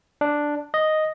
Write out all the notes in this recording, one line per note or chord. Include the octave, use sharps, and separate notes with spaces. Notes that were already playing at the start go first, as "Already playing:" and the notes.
D4
D#5